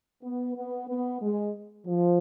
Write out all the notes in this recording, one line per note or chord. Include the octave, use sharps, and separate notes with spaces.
B3
B3
B3
G#3
F3